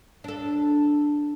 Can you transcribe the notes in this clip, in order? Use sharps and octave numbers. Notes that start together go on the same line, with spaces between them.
D4 A4